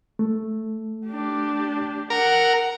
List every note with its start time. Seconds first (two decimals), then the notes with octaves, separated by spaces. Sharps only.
0.19 A3
1.07 D4 G4
2.10 A#4 F#5